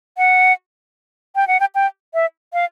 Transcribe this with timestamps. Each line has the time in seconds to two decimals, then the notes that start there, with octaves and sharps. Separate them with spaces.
0.18 F#5
1.36 G5
1.48 F#5
1.60 G5
1.75 G5
2.14 E5
2.53 F5